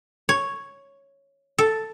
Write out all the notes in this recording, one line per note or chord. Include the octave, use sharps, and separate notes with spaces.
C#5
A4